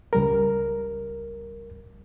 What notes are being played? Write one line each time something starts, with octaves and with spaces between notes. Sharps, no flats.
C#2 G3 A#4